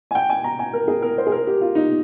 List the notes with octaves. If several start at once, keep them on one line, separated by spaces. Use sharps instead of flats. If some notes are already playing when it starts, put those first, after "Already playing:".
G#5
G5
G#5
A#5
G#5
A#4
G#4
A#4
C5
G#4
A#4
G4
F4
D#4